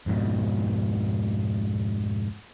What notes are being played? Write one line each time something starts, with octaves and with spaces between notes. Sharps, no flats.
F2 G#2 B2